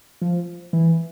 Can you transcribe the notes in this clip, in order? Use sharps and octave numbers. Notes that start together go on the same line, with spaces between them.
F3
E3